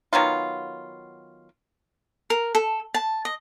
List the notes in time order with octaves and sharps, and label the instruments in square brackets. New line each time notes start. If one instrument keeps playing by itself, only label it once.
[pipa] D#3 F#3 B3 F4
[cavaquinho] A#4
A4
A5
D#5